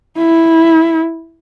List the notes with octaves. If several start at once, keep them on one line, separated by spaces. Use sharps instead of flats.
E4